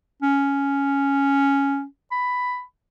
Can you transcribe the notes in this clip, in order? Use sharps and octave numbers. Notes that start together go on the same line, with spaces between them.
C#4
B5